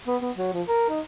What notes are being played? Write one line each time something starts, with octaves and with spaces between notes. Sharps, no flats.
B3
B3
F#3
F3
A#4
D#4